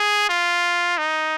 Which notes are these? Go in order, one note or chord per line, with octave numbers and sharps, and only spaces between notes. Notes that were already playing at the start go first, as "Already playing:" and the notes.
Already playing: G#4
F4
D#4